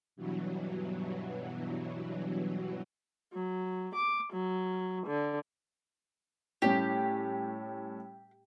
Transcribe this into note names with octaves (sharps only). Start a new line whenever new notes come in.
G2 B2 E3 F#3
F#3
D6
F#3
D3
A2 G3 C#4 G4